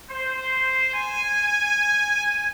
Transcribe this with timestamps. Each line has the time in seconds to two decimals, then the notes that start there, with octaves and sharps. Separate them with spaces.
0.10 C5
0.94 G#5